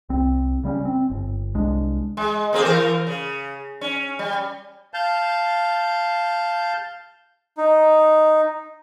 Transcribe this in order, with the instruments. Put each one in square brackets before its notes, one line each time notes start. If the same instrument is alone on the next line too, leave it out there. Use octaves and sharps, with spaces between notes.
[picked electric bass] C2 C4
C#3 G3 B3 C#4
C4
G1
C2 G#3 D4
[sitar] G#3
A#3 C4 G#4
E3 A#4
C#3
C#4
G3
[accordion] F5 A5 G6
[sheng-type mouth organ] D#4